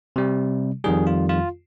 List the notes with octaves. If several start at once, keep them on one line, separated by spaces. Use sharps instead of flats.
C3 G3
F2 D#3 G3 G#4
F4
F4